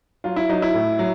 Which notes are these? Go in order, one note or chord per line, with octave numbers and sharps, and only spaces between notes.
F#3 F4
E4
F#3 D#4
E4
A2
F#3